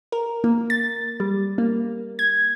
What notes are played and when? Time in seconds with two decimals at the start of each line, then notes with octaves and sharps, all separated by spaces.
0.12 A#4
0.44 A#3
0.70 A6
1.20 G3
1.58 A#3
2.19 G#6